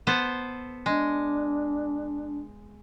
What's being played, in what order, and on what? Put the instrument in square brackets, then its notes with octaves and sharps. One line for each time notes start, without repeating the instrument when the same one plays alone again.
[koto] B3 A4 C5
[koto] G#3 [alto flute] D4